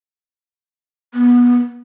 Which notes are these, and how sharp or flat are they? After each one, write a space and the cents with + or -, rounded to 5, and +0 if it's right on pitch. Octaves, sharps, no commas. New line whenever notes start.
B3 -20